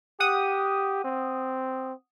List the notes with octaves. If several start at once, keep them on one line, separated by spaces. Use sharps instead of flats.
G4 F#5 D#6
C4